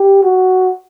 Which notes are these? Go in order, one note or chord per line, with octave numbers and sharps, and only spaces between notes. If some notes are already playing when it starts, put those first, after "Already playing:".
Already playing: G4
F#4